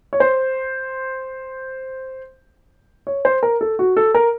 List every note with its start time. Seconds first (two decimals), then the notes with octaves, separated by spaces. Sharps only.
0.13 C#5
0.20 C5
3.07 C#5
3.25 C5
3.43 A#4
3.61 A4
3.79 F#4
3.97 A4
4.14 A#4